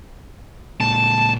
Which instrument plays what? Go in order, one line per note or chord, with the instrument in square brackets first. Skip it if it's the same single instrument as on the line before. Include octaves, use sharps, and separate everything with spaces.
[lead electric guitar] A#2 G#3 [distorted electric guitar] A5